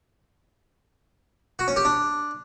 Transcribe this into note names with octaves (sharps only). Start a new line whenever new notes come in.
F#4
C#4
G4
D4